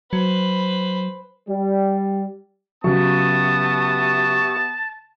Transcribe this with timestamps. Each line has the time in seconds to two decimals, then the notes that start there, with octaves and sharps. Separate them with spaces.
0.13 F#3 B4 C5
1.49 G3
2.84 C#3 F#3 B3 G4 E5 A5 C#6 D#6